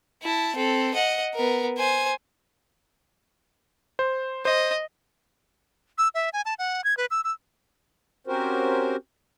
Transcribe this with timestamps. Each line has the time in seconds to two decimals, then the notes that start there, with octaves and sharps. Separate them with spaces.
0.22 E4 A5
0.55 C4 A4
0.94 D#5 F#5
1.35 B3 A#4
1.78 C5 G#5
3.99 C5
4.45 C5 D#5
5.98 E6
6.15 E5
6.33 G#5
6.45 A5
6.59 F#5
6.84 G#6
6.97 B4
7.11 E6
7.24 E6
8.27 C4 C#4 F#4 G4 A#4 C5